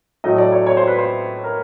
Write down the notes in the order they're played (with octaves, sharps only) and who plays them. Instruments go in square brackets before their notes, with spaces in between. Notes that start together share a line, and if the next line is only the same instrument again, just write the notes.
[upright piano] A2 F#3 A3 D#5
D5
C#5
C#5
C5
B4
C5
A#4